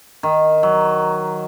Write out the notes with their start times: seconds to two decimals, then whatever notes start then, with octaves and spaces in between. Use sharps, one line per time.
0.23 D#3
0.63 F#3